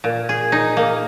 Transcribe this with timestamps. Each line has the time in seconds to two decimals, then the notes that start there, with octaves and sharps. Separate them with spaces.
0.04 A#2
0.29 G#4
0.52 D#4
0.77 A#3